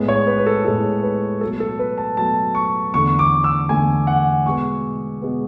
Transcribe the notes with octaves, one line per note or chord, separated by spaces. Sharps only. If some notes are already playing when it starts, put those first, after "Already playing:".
Already playing: A2 G#3 B3
C#5
B4
B4
A4
A2 G#3 B3 A4
B4
B2 F#3 A3 A4
A4
B4
A5
B2 F#3 A3 A5
C#6
E2 D3 A3 C#6
D6
E6
E2 D3 A3 G#5
F#5
B2 G#3 B3 C#6
B2 G#3 B3